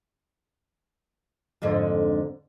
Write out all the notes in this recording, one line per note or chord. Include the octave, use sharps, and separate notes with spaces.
F2 G#2 D3